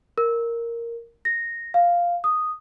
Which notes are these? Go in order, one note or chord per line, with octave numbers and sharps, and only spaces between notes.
A#4
A#6
F5
D#6